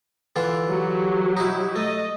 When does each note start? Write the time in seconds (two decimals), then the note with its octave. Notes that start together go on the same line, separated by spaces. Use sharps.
0.36 D3 E3 F4
0.66 F#3 G4
1.37 D#4 E4
1.76 A3 D#5